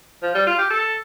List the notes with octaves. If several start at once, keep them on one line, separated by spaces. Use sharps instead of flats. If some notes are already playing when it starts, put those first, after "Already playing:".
F3
G3
F4
G4
A4